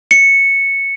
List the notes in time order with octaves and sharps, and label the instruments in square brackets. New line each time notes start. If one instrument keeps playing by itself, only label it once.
[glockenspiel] C#7